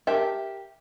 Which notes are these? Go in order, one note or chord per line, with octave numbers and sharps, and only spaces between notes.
G4 A#4 E5 A5